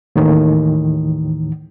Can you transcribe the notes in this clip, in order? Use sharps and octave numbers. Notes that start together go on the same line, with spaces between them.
D#2 A2 D#3 E3